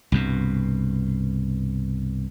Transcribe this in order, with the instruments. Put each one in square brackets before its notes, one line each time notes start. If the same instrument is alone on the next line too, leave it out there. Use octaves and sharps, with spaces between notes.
[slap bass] C2 G2 B2